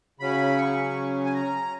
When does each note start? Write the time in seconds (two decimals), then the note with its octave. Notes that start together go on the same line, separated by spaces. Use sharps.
0.20 C#3 F#3 C#4 B5
0.58 C#6
1.25 G#5
1.34 A#5